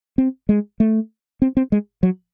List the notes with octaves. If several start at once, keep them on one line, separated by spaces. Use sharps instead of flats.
C4
G#3
A3
C4
C4
G#3
F#3